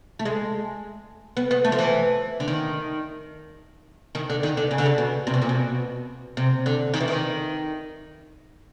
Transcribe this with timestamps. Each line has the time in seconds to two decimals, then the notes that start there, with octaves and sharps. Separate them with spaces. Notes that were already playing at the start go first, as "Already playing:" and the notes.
0.19 A3
0.25 G#3
1.37 B3
1.51 B3
1.65 A3
1.72 F3
1.78 E3
2.40 D3
2.48 D#3
4.15 D#3
4.30 D3
4.43 D#3
4.57 D3
4.71 C#3
4.78 D3
4.86 C#3
4.98 B2
5.27 C3
5.34 B2
5.42 A#2
5.49 B2
6.37 C3
6.66 D3
6.94 D#3
7.00 E3
7.08 D#3